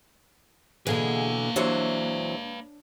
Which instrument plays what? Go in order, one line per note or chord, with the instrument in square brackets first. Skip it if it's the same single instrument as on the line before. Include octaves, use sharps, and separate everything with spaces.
[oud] B2 D3 E3 [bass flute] A#3 [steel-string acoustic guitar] G#4 [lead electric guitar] B4 F5
[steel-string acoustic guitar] E3 F#3 C5 [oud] D4 C#5